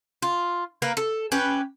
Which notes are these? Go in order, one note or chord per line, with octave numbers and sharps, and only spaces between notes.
F4
A#3 A#4 B4
A4
C#4 G4 B4